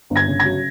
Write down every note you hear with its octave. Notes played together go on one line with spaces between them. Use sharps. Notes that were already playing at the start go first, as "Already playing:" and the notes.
G1
G#6 A#6
C#3
G#6 A#6
F#3